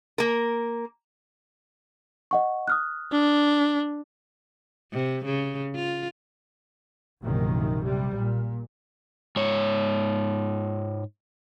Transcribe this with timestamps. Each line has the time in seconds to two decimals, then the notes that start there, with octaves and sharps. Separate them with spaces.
0.18 A#3 A#4
2.31 D#5 F#5 C#6
2.68 D#6 F6 F#6
3.12 D4
4.92 C3
5.25 C#3
5.75 F4
7.21 A#1 F#2 C3 D#3
7.83 C3 G3
8.14 A#2
9.36 G#2 C#5